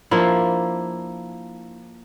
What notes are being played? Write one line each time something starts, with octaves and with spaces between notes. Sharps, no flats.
F3 A#3 D4 E4